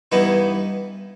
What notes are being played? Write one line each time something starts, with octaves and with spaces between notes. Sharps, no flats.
G2 E3 B3 D#4